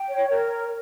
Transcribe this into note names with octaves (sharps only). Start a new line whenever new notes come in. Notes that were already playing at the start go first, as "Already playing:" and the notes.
Already playing: G5
C#5
A#4